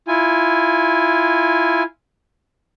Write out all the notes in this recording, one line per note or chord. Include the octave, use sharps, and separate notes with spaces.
E4 F4 G#5